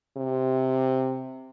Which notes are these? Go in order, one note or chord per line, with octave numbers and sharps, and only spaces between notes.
C3